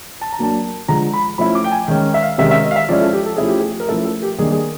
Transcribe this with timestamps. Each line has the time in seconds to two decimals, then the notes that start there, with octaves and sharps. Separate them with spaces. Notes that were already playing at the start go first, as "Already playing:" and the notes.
0.21 A5
0.33 A#5
0.39 F#3 A#3 D4 A5
0.88 D3 F3 G#3 A#5
1.14 B5
1.38 F3 A3 C#4 E4 B5
1.55 D6
1.64 G5
1.72 G#5
1.88 D#3 G#3 C#4 G5
2.14 E5
2.22 F5
2.38 C3 D#3 G#3 C#4 E5
2.51 E5
2.63 D#5
2.71 F5
2.76 E5
2.89 F3 G#3 C#4 E4 D5
3.01 A4
3.13 G4
3.26 A4
3.37 F3 A3 C#4 E4 G#4
3.48 G4
3.59 G#4
3.80 A#4
3.88 F3 A3 C#4 E4 A4
3.99 A#4
4.05 A4
4.22 G4
4.38 D#3 G3 A#3 D4 G#4
4.52 G#4